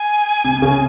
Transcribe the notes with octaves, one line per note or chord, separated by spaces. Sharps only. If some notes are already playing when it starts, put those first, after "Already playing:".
Already playing: G#5
C3
C3
C#3